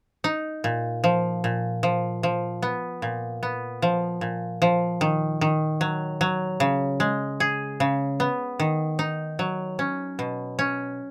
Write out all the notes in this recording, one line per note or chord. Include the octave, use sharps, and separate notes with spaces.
D#4
A#2
F3
A#2
F3
F3
B3
A#2
B3
F3
A#2
F3
D#3
D#3
F#3
F#3
C#3
G#3
G#4
C#3
B3
D#3
D#4
F#3
C#4
B2
C#4